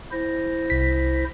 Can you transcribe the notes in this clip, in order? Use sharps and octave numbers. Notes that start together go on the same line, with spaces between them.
E4 C5 A#6
C2 B6